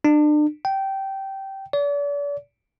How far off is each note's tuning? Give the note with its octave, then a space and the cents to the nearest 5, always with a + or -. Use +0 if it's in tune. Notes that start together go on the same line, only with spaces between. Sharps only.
D4 +35
G5 -15
D5 -40